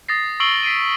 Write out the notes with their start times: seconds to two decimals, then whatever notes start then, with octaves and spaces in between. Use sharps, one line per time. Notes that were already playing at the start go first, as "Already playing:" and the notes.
0.09 D#6 A6 A#6 C7
0.40 C#6 E6 C7 D7 F#7 G7
0.63 B6 C7 D7 D#7